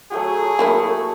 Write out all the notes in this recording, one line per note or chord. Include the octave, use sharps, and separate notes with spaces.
F#3 A3 F#4 G#4
F#3 A3 A#3 E4